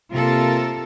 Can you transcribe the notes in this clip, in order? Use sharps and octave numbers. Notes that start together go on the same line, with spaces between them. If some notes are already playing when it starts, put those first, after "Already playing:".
C3 A#3 F4 A4 A#4